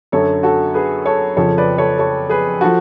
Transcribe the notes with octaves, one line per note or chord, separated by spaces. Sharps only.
F#2 D3 F#3 A4 C#5
F#4 A4
G#4 B4
A4 C#5
F2 C#3 F3 A4 C#5
B4 D5
A4 C#5
A4 C#5
G#4 B4
F3 F#4 A4